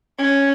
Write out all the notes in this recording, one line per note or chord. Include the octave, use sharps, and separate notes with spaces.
C#4